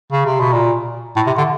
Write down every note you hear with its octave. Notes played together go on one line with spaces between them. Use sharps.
C#3
C3
B2
A#2
A2
C3
D3